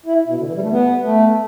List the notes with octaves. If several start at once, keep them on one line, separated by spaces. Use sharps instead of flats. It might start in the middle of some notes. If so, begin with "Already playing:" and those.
E4
B2
D3
E3
G3
A3
B3
A3